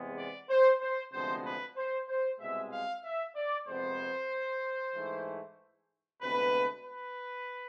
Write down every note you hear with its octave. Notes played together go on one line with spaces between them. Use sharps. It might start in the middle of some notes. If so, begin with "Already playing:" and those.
Already playing: E2 C3 G#3 B3
D5
C5
C5
D2 C3 F3 G#3 B3 C5
B4
C5
C5
C2 B2 G#3 E5
F5
E5
D5
F2 C3 G#3 B3 C5
G#2 E3 A3
D2 C3 G#3 B3 B4
B4